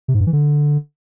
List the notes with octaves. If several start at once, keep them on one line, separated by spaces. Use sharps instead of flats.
C3
G#2
G2
E3
D3